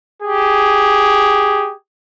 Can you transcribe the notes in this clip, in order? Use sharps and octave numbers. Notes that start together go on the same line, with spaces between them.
G4 G#4